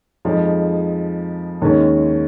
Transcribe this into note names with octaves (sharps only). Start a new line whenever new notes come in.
F2 F3 G#3 D#4 G#4
D#2 D#3 G#3 C#4